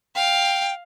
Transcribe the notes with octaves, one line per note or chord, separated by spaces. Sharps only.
F5 G5